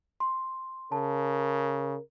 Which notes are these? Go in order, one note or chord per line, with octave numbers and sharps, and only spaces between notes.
C6
C#3 A#4 A5